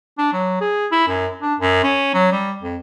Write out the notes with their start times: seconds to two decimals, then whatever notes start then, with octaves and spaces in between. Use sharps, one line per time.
0.18 D4
0.33 F#3
0.61 G#4
0.92 E4
1.07 F#2
1.41 D4
1.59 F#2
1.83 C#4
2.14 F#3
2.32 G3
2.62 F2